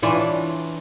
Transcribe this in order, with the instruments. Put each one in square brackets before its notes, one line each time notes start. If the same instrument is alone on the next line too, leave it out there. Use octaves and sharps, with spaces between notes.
[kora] E3 D4 F4 C#5